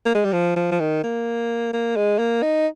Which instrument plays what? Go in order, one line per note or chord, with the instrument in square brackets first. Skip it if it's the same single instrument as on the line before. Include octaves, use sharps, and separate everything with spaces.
[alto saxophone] A#3
G#3
G3
F3
F3
F3
D#3
A#3
A#3
G#3
A#3
D#4